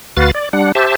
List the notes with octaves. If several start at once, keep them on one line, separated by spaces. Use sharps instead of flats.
D2 F#4 B4 F5 A6
D5
G3 D4 F#5
G4 C5 E5 A5